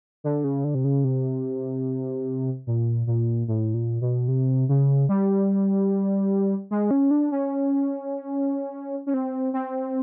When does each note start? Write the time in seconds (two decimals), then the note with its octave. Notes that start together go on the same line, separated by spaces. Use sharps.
0.24 D3
0.44 C#3
0.64 D3
0.75 C3
0.84 C#3
1.04 C3
2.67 A#2
3.07 A#2
3.48 A2
3.74 A#2
4.01 B2
4.28 C3
4.69 C#3
5.09 G3
6.71 G#3
6.91 C#4
7.11 D4
7.32 C#4
9.07 C#4
9.14 C4
9.54 C4